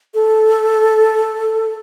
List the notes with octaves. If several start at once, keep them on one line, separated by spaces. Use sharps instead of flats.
A4